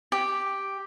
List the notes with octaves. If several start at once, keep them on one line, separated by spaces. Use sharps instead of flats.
G4